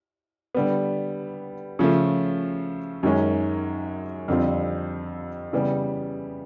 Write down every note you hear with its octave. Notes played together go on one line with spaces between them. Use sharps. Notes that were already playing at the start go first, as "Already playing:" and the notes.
D3 G3 B3
C#3 F3 A3
F#2 D#3 G#3 C#4
F2 D3 G3 C4 F4
C#3 E3 G3 B3